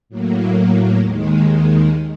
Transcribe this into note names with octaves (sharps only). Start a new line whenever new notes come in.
A2 F#3 A#3
D#2 D#3 G#3